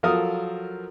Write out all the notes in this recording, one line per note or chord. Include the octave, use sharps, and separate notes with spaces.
F3 F#3 A4 A#4 F5 D#6